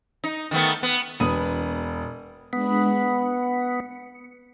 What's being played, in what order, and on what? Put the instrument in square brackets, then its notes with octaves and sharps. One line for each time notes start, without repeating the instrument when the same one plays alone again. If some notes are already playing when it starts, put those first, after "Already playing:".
[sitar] D#4
D#3 A3 B3
B3
[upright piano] E1 B4 D#6 D#7
[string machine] G#3 D4 F#6 [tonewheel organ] B3
[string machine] C#7